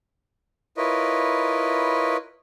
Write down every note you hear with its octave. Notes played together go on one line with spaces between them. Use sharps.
E4 F4 A#4 B4 C#5 D#5